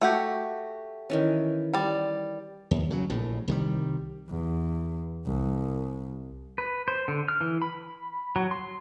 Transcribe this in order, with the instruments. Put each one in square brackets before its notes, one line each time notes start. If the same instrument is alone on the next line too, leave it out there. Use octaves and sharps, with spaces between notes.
[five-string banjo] A3 F#4 G4
[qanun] D#3 E3 C#4
[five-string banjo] G3 D5
[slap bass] D#2
C#3 F#3
A#1 A2
C2 D#3 G3
[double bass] E2
C2
[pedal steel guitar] B4
C5
D3
F6
E3
B5
F#3
C6